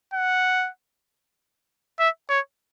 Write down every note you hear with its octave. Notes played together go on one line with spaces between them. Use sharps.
F#5
E5
C#5